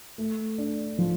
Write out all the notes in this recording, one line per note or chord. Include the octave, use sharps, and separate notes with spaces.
A3
D4
F3